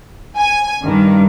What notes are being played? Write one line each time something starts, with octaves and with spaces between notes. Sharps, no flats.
G#5
G2 D#3